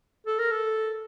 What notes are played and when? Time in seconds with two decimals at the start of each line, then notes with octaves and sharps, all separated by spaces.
0.27 A4
0.39 A#4
0.51 A4